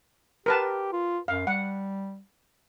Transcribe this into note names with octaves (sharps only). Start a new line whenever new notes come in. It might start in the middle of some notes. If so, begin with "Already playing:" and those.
G4 A#4 B4 A5
F4
F#2 F5
G3 F#5